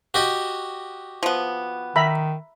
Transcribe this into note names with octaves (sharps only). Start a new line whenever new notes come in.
F#4 G4 D#5
F3 B3
D#3 E5 A#5 B5